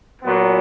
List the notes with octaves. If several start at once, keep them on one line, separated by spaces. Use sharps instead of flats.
A#2 F#3 B3